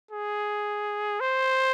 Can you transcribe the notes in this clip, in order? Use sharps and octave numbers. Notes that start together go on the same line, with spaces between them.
G#4
C5